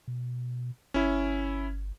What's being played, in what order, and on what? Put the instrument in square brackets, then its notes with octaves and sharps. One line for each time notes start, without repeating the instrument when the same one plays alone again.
[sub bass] B2
[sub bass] G1 [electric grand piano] C#4 E4